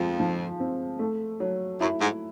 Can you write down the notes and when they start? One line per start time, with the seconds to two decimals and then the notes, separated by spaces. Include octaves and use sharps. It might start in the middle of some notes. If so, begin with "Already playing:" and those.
Already playing: F2 F3 G#3
0.19 F3
0.60 C4
0.99 A3
1.40 F#3
1.80 F#2 E4
2.01 G#2